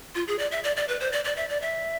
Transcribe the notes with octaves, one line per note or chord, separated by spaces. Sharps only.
F4
G#4
D5
E5
D5
D5
B4
C5
D5
D5
E5
D5
E5